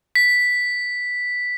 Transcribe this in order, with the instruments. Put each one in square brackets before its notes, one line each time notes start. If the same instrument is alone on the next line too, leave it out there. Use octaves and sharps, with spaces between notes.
[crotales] B6